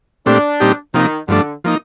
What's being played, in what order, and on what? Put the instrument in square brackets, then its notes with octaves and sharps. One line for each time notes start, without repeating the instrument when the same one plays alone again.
[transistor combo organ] A#2 A3 C4 G4 [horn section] D4
[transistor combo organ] A#2 G3 C4 D#4 G4
[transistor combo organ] C3 F3 A#3 D#4 [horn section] D#3
[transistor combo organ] G2 F3 A3 D4 [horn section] D3
[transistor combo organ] F3 A#3 D#4